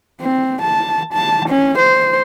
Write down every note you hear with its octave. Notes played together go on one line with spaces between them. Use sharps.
C4
A5
A5
C#4
C5